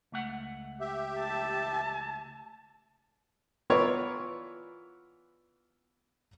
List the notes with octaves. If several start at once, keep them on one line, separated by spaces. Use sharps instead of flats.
C#2 A3 F#5
G4 E5
A5
E3 B3 F4 A#4 C#5 D5